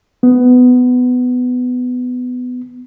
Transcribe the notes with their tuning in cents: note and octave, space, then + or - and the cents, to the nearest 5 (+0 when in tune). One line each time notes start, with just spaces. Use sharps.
B3 +15